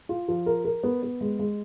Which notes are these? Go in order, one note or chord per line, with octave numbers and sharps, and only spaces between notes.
F4
F3
A#4
A#4
B3
B3
G#3
G#3